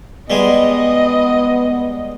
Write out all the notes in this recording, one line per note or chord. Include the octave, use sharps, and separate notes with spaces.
G3 G#3 B3 D#5